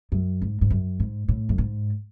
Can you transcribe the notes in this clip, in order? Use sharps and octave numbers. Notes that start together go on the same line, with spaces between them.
F#2
G#2
G#2
F#2
G#2
A2
F#2
G#2